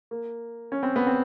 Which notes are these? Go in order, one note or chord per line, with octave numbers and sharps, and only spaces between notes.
A#3
C#4
C4
B3
C4